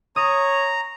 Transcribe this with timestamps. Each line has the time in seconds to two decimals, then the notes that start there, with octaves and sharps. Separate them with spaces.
0.16 C#5 A#5 D#6